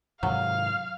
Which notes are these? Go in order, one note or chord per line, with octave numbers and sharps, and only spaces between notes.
G#2 C3 D#3 F#3 F5